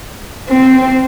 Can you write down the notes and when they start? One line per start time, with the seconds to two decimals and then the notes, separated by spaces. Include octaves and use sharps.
0.49 C4